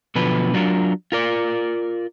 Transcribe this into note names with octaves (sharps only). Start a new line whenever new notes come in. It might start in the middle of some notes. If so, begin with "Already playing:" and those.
B2 D3 F3 F#3 B4
F#3 D4 F4 A#4
F4 A#4 D5